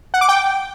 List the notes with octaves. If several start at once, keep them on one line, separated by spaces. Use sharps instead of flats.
F#5
D6
G5